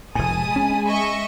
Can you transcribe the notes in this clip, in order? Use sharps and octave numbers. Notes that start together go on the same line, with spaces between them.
F1 A2 G#3 G#5 A5 B5 D#6
C#4
D#5 E5 C#6